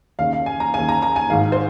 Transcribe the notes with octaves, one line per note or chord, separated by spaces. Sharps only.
D#2 C#3 F5
F5
G#5
A#5
D#2 C#3 G#5
A#5
A#5
G#5
G#1 G#2 D#3 F5
C5